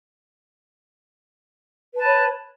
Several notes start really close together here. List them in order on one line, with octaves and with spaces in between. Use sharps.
B4 A5 B5 C#5